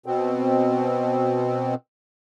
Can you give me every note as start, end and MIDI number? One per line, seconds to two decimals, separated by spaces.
0.06 1.75 47
0.06 1.75 60